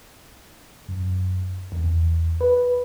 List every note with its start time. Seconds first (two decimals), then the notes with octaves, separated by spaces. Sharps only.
0.88 F#2
1.72 E2
1.84 E2
2.41 B4